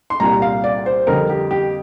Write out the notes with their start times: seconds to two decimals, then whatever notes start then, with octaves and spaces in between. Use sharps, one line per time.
0.10 C6
0.20 C2 A#2 G3 A#5
0.42 F5
0.64 D5
0.86 C5
1.07 F2 D3 G3 A#4
1.29 G4
1.51 G4